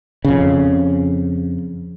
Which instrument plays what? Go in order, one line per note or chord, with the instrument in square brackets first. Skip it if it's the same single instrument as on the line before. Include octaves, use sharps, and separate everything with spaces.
[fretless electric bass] F2 C#3